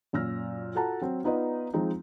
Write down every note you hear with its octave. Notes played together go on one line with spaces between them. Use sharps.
F#2 A#2 E6 F6 A#6
F4 F#4 A4 F#5 A5 A#5
F#3 C4
B3 D#4 F4 B4 D5 D#5
F3 G#3 C4 D#4